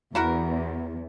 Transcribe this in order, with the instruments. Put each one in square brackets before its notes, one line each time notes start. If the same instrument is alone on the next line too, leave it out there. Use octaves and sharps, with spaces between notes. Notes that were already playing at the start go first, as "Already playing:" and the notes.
[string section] E2 [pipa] E4 F#4 A#4